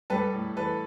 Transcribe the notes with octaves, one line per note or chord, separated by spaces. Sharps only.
G3 A4 B4
A2
E3 A4 B4